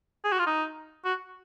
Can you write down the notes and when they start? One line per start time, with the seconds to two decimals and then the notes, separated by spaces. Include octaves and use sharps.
0.25 G#4
0.32 F#4
0.39 F4
0.47 D#4
1.05 F#4